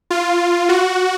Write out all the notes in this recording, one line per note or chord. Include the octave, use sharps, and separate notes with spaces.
F4
F#4